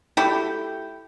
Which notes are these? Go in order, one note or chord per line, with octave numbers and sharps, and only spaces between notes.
A3 E4 F#4 G4